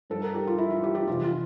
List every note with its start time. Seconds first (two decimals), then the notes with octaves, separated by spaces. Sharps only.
0.10 G2 F3 A4
0.22 A#4
0.35 G4
0.47 F4
0.58 E4
0.70 F4
0.83 G4
0.95 G4
1.07 F2 C3 E3 F4
1.24 F4